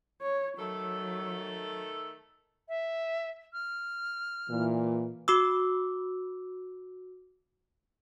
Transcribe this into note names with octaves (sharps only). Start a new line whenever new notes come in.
C#5
D#3 F#3 A3 A4
E5
F6
A#2 E3
F#4 D6 E6